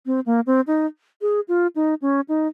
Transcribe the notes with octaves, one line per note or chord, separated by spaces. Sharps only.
C4
A#3
C4
D#4
G#4
F4
D#4
C#4
D#4